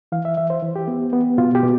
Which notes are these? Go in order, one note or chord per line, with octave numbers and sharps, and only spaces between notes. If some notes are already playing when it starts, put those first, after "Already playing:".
E3 F5
E5
E3 E5
C5
E3
G4
B3
B3
B2 F4
G4
B2